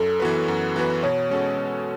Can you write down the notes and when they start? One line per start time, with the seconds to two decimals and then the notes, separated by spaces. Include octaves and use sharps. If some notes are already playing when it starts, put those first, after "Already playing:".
Already playing: F#2 A4
0.20 E3 B3 F#4 B4
0.48 F#2
0.76 E3 B3 F#4 B4
1.03 B2 C#5
1.30 G#3 C#4 F#4 A4
1.58 B2